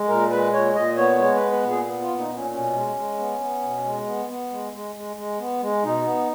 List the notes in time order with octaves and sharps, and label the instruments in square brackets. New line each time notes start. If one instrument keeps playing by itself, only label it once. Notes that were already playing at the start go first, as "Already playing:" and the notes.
Already playing: [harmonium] G#3
A#2 A#4
G#3 B4
A#2 C#5
A#2 D#5
B3 C#5
G#3 C#5
B3 B4
B4
A#2
G#4
B3
F4
A#2
D#4
A#2 B3
C#4
B2 C#4
G#3
G#3
B3
B3
B2
G#3
B3
B3
G#3
G#3
G#3
G#3
B3
G#3
B2 D#4
B3